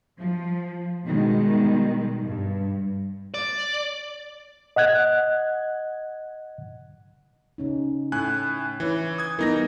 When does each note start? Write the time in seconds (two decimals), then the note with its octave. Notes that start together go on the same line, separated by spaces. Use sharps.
0.19 F3
1.06 B2 D#3 G3 G#3
2.23 G2
3.34 D5
4.76 D#5 F#5 F#6 G#6
7.58 C#3 C#4 D#4
8.12 A2 G#5 F#6
8.80 E3 E4 C#5
9.18 D#6 G#6
9.39 E3 G3 B3 D#4 A#4 A#6